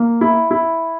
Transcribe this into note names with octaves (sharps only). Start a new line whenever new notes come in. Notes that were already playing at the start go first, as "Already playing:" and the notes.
Already playing: A#3
E4
E4